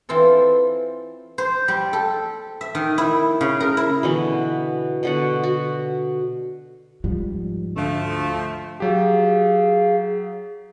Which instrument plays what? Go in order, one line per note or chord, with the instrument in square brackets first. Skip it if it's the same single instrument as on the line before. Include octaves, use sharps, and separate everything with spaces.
[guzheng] E3 C4 F4 A4
C5
G3
A4
E5
D#3
E4
C#3
A#4
E4
[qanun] B2 D3 E3
B2 D3 F#5
F#4
[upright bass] G#2 [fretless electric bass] F3 G3
[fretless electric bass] D2 D3 [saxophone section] F3 A3
[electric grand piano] F#3 G4 [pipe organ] G#4 F5